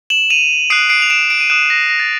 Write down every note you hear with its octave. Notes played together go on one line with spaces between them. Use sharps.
E7 F#7
D#7 F7
D#6 F#6 C7 D7
C7 D7
F7
D7 E7
D7
D#7
D#6 F#6 D7 E7
A#6
A#6
A6